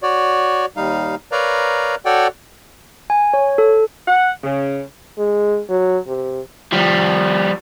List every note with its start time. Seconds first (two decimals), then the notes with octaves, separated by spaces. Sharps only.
0.03 F#4 C#5 D5
0.76 D#2 G3 D#4 F5
1.32 A#4 B4 C#5 D5 F5 A#5
2.05 F#4 A4 C#5 D5 F#5 G5
3.10 G#5
3.33 C#5
3.58 A4
4.07 F#5
4.44 C#3
5.18 G#3
5.69 F#3
6.07 C3
6.73 F3 G3